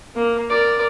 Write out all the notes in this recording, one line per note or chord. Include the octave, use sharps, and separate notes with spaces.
A#3
A#4 D5